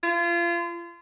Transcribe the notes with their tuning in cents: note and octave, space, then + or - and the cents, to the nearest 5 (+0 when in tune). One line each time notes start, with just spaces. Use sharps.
F4 -30